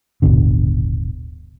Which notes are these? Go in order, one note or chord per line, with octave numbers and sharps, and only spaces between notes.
D#1 G#1 B2 D3